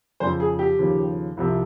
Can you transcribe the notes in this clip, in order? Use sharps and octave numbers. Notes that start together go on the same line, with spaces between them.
F2 C#3 F3 C5
G#4
G4
D#2 C#3 F3
C2 C3 F3